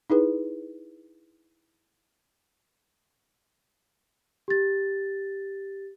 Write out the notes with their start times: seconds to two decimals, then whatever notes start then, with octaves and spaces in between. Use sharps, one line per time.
0.10 D#4 E4 G#4 B4
4.48 G4 A6